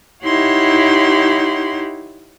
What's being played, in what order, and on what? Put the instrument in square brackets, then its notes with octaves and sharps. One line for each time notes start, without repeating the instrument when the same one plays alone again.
[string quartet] D#4 E4 G4 C#5 F#5 C6